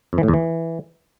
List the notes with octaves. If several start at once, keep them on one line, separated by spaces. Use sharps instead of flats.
F2
E3
A2
E2
E3